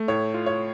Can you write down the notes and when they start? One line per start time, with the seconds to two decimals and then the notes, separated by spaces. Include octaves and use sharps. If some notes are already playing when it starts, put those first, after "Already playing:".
Already playing: A3
0.08 A2 C#5
0.34 F4
0.46 C#5